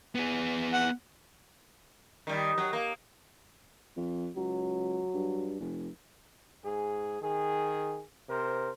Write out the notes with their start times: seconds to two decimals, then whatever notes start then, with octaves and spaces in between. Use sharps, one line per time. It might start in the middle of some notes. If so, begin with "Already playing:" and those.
0.15 B3 G#4
0.73 F#5
2.27 D#3 G3
2.58 F#3
2.73 A#3
3.97 F2
4.36 C#2 F#3
5.14 G2
5.60 F1
6.64 G#2 G#4
7.21 D#3 G#4
8.29 C3 A#4 C5